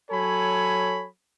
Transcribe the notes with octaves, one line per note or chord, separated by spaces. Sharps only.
F#3 A4 C#5 G#5 B5